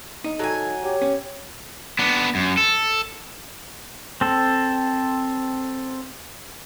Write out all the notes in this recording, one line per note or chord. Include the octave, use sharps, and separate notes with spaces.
D#4
F#3 A4 G#5
G4 C#5
C#4
B3 D4
F#2
A4
C4 A4